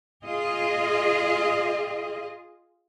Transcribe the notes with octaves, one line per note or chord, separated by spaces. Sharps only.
F4 G#4 D#5